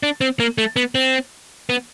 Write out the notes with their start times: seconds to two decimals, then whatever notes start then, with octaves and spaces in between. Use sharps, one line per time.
0.03 D4
0.21 C4
0.40 A#3
0.58 A3
0.76 B3
0.95 C4
1.69 B3